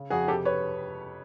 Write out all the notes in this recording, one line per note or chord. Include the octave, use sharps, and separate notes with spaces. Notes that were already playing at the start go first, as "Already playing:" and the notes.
Already playing: C#3
F2 F#4 G#4
C3 G4 A4
B4 C#5